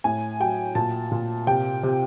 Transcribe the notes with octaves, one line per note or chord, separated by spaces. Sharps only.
A2 G#5
F#3 G5
A#2 A5
A#2
C3 G5
C3